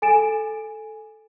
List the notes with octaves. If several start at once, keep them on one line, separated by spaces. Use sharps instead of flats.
A4 G#5 A6 D7 E7